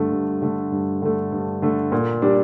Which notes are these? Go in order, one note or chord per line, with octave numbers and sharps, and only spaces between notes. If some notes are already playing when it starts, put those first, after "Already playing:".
Already playing: G2 D3 A3
G2
D3 A3
G2
D3 A3
G2
D3 A3
A#2
G3 D4